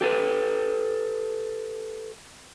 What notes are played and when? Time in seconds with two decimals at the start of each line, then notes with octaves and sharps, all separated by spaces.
0.01 G4 A4 B4